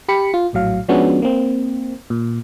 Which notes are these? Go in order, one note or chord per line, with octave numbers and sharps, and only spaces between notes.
G4 B5 C#7
F4
A#1 A2 F#3 F5
F3 G#3 B3 C#4 D4 F#4
A#3 C4
A#2